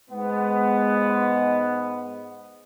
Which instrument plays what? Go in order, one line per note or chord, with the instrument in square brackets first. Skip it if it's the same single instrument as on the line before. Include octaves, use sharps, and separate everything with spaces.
[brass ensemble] G#2 G#3 B3